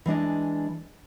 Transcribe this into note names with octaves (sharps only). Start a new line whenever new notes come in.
E3 G#3 D4 D#5